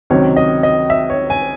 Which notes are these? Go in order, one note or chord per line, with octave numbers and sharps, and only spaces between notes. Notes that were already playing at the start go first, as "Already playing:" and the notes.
C#2 C3 D#3 F#3 C4 C#5
D#5
D#5
E5
C#5
G#5